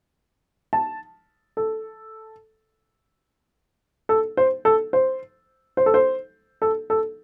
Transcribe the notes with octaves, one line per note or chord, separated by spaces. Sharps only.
A5
A4
A4
C5
A4
C5
C5
A4
C5
A4
A4